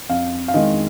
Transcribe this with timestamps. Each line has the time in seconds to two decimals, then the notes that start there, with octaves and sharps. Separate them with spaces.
0.09 F2 F5
0.48 F5
0.54 D#3 G#3 D#5